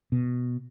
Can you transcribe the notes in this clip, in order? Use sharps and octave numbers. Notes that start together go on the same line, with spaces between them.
B2